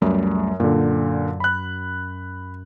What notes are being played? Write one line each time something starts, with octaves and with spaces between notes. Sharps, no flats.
C#2 F#2 G3 A3
F#2 A#2 D3
B5 F#6